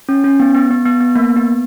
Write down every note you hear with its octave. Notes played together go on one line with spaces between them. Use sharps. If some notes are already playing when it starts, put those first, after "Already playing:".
C#4
C#4
B3
B3
B3
B3
B3
A#3
B3